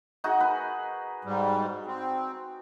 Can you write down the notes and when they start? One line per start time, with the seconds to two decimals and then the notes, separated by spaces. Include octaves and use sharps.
0.24 D#4 F#4 G#4
0.40 B4
1.25 G#2 G3
1.86 C4